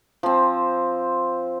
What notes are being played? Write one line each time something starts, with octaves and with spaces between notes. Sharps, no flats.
F3 C4